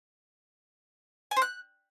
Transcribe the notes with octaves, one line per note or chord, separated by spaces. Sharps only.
G#5
C5
F#6